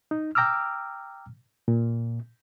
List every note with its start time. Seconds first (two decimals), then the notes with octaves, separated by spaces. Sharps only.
0.11 D#4
0.35 G5 A#5 D6 E6 F6
1.68 A#2